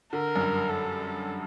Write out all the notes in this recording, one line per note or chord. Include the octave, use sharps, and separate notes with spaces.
D3 A#4
F#2
G2
A4